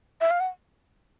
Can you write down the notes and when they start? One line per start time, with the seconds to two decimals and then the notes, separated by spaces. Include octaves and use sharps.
0.21 E5
0.31 F5
0.40 F#5